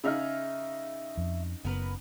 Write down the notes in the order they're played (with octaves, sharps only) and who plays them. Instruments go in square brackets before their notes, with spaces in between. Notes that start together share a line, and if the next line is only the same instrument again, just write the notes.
[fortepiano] C#3 D#4 F6 [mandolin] G#4 E5 F5
[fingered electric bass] F2
[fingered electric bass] F#1 [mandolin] B3 A#4 B4